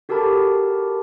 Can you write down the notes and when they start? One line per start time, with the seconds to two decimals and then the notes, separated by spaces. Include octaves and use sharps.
0.09 F#4 G4 A4 A#4 A5 B5